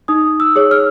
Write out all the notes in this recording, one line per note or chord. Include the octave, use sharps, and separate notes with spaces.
D#4 D#6
E6
G#4 C#5
F6